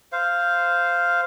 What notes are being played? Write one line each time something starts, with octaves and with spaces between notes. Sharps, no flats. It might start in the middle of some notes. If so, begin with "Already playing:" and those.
C5 F5